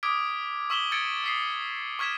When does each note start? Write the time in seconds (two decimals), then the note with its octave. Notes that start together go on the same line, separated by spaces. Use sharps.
0.03 D6 D#6 F6 G#6 B6 D7
0.70 C#6 E6 B6 E7 F#7 G7
0.92 E6 G#6 A6 C#7 D7
1.24 D#6 B6 C7
1.99 C#6 F6 G#6 B6 E7